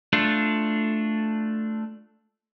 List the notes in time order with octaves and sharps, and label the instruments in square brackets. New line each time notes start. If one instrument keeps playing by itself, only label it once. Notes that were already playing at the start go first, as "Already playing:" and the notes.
[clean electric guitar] A3 D4 F4